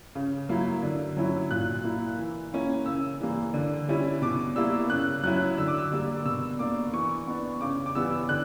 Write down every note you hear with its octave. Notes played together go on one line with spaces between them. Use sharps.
C#3
F#3 A#3 E4
D3
F#3 C#4 E4
A#2 F#6
A#3 E4
E3
A#3 C#4 E4
C#3 E6
E3 G3 A#3
D3
G3 C#4 E4
B2 D6
G3 A#3 E4 E6
C#3 F#6
F#3 C#4 E4 F#6
D3 E6
D6
E6
G3 A#3
B2 E6
A#3 D4 D6
E3 C#6
B3 D4
C#3 D6
D6
E3 G3 B3 E6
D3 F#6